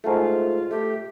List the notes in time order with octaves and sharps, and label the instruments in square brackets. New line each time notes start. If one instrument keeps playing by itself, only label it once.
[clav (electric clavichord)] G#2 A3 [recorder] F4
[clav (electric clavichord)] A3 [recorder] G4